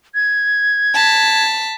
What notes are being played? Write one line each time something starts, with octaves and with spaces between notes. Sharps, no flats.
G#6
A5 B6